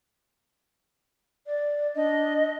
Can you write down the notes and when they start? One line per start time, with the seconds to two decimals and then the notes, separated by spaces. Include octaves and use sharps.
1.47 D5
1.96 D4 D#5